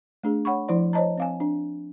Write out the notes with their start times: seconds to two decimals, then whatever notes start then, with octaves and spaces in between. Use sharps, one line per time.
0.23 A3 D4 G#4
0.45 C#5 F#5 B5 C#6
0.68 F3 E4 C5 D5 C6
0.93 C5 C#5 D#5 A5 A#5
1.18 C4 F5 G#5
1.40 D4